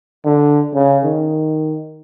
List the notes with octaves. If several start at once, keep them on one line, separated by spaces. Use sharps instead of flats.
D3
C#3
D#3